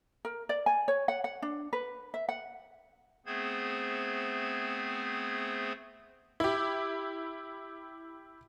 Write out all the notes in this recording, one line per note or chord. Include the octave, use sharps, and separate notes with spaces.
A#4
D5
G#5
C#5
F#5
F#5
D4
B4
E5
F#5
A3 B3 C4 G#4 C5 G#6
E4 G4